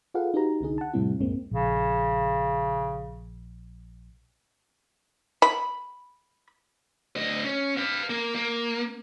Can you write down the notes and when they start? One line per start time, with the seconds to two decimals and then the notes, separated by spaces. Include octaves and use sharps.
0.14 F4 G#4 A4 B4 F5 F#5
0.34 D#4 F#4 G4 B4 A#5
0.61 C2 D3 D#4 G#4
0.78 F#5 A5
0.93 F2 A2 C3 G3 C4 E4
1.19 C2 F#2 A2 G#3 A#3 C4
1.51 A#1 C#3
5.42 B5
7.16 D2 D#5
7.44 C#4
7.77 B4 F5
8.10 A#3
8.35 A#3